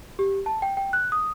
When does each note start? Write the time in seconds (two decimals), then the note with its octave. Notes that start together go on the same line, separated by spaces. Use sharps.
0.19 G4
0.46 A5
0.62 G5
0.77 G5
0.93 F#6
1.12 D#6